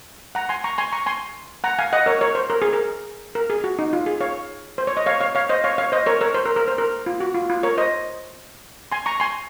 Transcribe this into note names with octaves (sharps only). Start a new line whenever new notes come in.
F#5 A#5
G#5 C6
A#5 C#6
G#5 C6
A#5 C#6
G#5 C6
F#5 A#5
F5 G#5
D#5 F#5
A#4 C#5
A#4 C#5
C5
A#4
G#4
A#4
A#4
G#4
F#4
D#4
F4
G#4
C#5 F5
C5
C#5
D#5
C#5 F5
C#5 F5
C#5 F5
C5 D#5
C#5 F5
C#5 F5
C5 D#5
A#4 C#5
A#4 C#5
C5
A#4
A#4
C5
A#4
F4
F#4
F4
F4
A#4 C#5
C5 D#5
G#5 C6
A#5 C#6
G#5 C6